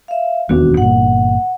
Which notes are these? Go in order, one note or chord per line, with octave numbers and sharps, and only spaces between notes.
E5 F5
E1 D#2 B3 D4 F#4
G1 A#2 F#5